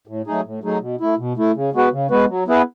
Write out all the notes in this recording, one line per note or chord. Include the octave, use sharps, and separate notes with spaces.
A2
F#3 A3 D#4 G#4
A2
F#3 A3 D#4 G#4
B2
A3 E4
B2
A3 E4
C#3
G#3 B3 F#4 B4
C#3
G#3 B3 F#4 B4
F#3
B3 E4 G#4 B4